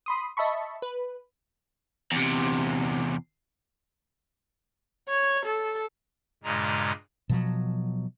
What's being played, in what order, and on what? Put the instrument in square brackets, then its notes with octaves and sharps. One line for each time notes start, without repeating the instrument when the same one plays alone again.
[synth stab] B5 C6 D#6
D#5 E5 A5 B5 C#6
B4
[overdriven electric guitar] E2 C3
[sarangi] C#5
A4
[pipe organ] G2 A#2 C#3 G#3 A#5
[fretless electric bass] B2 F3 F#3